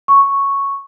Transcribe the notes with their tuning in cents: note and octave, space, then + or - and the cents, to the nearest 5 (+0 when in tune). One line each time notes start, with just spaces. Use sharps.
C#6 +0